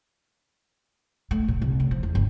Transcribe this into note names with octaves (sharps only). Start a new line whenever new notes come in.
A3
A#2
C2
A2
F3
E2
G1